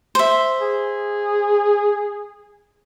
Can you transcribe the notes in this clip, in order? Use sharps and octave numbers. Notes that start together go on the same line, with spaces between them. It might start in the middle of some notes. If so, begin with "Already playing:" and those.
C5 E5
G#4